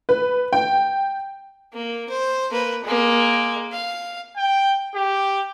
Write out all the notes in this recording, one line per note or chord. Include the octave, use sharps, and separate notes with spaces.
B4
G5
A#3
C5
A#3 B4
G#3 A#3
F5
G5
G4